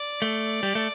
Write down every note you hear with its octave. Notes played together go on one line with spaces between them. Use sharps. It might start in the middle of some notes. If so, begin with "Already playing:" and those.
Already playing: D5
A3
G3
A3